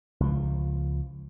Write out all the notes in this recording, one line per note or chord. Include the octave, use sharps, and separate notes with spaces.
C#2 F3